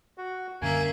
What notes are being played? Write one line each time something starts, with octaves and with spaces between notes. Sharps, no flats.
F#4
F#2 D3 G3 A#3 C#4 A#4 E5 G#5